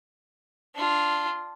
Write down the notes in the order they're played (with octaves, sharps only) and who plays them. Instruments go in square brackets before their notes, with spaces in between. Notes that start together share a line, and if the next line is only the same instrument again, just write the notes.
[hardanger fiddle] D4 F4